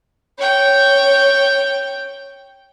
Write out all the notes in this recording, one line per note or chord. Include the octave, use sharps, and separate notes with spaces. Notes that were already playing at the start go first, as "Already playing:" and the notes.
C#5 G5